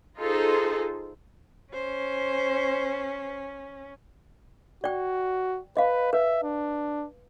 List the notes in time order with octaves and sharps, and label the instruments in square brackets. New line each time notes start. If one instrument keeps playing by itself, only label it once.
[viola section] D#4 F4 G#4 A4 C5
[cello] C#4 [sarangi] C5
[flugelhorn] F#4 [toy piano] D5 G5
[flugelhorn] B4 [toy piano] D#5 F5
[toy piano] B4 [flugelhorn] E5
[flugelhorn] D4